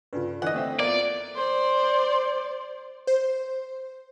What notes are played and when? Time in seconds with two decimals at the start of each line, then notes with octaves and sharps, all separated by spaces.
0.13 G2 C#3 F4 A4 B4
0.42 D3 E3 D#5 F#5
0.54 A3 C4 E5
0.79 E2 A#3 D5
1.35 C5 D5
3.07 C5